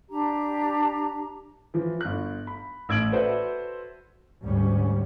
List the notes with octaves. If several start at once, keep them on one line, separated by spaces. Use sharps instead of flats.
D4 G4 A#5
E3 F3
G1 F#6
B5
A1 E6 G#6 D7 F#7
F#4 A4 B4 C5 D5 E5
D2 G#2 G3 C#4